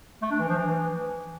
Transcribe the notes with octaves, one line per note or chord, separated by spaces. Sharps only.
A3
D4
E3
F3
E3